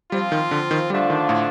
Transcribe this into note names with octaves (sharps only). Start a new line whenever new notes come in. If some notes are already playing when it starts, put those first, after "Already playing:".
F3 G3 C4 F4
D#3
D3
D#3
D3 F3 G3 A3 D4 F4
D#3
A2